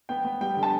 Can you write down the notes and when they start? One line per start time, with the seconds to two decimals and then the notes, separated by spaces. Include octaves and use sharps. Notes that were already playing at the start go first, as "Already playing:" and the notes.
0.09 B3 G5
0.25 B3
0.41 G3 G5
0.57 D3
0.63 A5